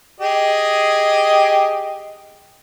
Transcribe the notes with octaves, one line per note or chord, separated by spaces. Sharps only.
G4 G#4 D#5